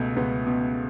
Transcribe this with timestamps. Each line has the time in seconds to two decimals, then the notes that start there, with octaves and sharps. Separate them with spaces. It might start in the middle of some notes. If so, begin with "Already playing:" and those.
Already playing: C#2 B2 A3
0.16 C#2 B3
0.46 B2